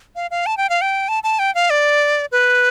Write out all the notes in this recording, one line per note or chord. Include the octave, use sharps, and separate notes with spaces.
F5
F5
A5
G5
F5
G5
A5
A5
G5
F5
D5
B4